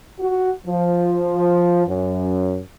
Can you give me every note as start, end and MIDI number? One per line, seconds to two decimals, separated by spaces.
0.20 0.50 66
0.67 1.84 53
1.87 2.59 42